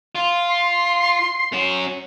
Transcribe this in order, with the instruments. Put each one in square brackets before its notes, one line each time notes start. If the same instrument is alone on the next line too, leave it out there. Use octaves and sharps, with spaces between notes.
[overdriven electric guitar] F4
[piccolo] C6
[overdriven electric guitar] C#4 F#4